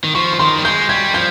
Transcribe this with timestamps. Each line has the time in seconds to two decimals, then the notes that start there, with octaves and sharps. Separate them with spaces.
0.04 D#3
0.15 F3 C#6
0.33 C#6
0.40 D#3 C6
0.58 G3
0.65 G#3 G6
0.89 G3 G#6
1.14 F3 G6